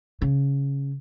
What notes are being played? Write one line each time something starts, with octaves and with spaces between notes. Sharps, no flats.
C#3